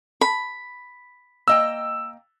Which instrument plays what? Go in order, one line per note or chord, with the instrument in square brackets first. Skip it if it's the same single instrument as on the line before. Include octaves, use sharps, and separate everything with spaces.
[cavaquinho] B5
[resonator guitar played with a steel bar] A#3 D#5 G5 [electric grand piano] E6